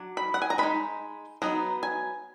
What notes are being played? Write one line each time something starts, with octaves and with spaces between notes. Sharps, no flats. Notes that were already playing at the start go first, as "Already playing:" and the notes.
Already playing: F#3 D4
B5
F#5
G#5
A#5
G#3 D#4 B5
F#3 B3 D#4 A#5
G#5